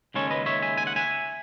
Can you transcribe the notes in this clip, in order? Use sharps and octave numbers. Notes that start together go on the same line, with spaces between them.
D#2 C#3 G#3 C#4 A4 C#5
B4 D#5
C#5 E5
E5 G#5
G#5
F#5
E5 G#5